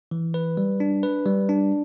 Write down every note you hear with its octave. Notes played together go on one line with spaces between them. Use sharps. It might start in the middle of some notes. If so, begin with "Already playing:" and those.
E3
B4
G3
D4
B4
G3
D4